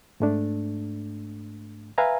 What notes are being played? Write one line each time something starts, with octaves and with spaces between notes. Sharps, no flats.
G#2 A3 D4
B4 E5 F5 G#5 A#5